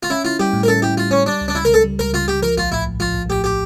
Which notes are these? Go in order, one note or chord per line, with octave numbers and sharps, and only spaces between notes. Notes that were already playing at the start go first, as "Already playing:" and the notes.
F4
C#4 E4
E4 F4
G3 G4
A2
A#4
C#4 A4
E4 G4
G3 F4
A2 C#4
G3 D4
C#2
D4
C#3 E4
A#4
C#2 A4
G3
C#2 A#4
C#3 F4
C#2 G4
F3 A#4
A#1 F4
A2 E4
A#1
F3 F4
A#1
A2 G4
G4